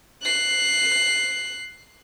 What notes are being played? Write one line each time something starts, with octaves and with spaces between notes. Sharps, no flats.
F#6 C7